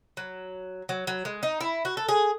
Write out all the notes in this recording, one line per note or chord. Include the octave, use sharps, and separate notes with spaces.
F#3
F#3
F#3
G#3
D#4
E4
F#4
A4
G#4